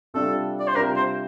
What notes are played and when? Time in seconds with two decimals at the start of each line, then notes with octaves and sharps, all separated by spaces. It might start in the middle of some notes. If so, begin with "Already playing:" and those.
0.14 C3 G3 D4 F4 A4
0.60 D5
0.67 C5
0.75 C3 G3 D4 F4 A#4
0.96 C5